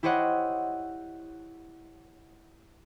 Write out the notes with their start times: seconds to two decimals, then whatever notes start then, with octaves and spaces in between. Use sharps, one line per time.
0.03 E4 G4 C5 C#5 D#5 F#5